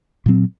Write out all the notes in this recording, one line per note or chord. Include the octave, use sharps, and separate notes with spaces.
A#2 F#3 C4